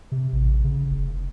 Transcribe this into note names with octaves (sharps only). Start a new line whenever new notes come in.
C3
A1
C#3
F1